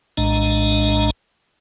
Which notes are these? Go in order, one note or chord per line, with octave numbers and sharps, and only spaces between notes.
A#1 A2 G#3 D4 D#5 A#5